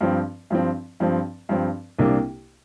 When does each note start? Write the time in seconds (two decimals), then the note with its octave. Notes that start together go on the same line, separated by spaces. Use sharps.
0.01 G2 F3 C4
0.50 G2 F3 C4
1.00 G2 F3 C4
1.49 G2 F3 C4
1.99 C2 C3 A#3 D4